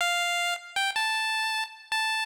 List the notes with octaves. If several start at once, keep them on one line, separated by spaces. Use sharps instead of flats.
F5
G5
A5
A5